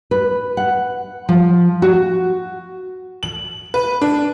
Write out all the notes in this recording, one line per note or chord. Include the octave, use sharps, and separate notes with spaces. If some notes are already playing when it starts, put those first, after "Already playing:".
B4
F#5
F3
F#4
F#7
B4
D4